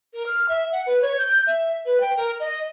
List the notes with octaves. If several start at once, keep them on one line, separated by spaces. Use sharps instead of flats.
A#4
F6
E5
F#5
B4
C#5
G6
E5
B4
G5
A#4
D#5